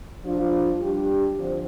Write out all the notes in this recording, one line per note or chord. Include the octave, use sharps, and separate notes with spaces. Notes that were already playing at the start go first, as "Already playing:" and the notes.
F3 D4 F4
G3 D4 G4
D3 F3 C4